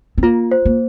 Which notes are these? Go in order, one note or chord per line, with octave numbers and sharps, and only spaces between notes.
C4
A#3 F4
C5
A#3